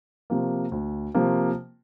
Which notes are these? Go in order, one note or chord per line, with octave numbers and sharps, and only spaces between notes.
C3 F3 A#3
D2
C3 F3 A#3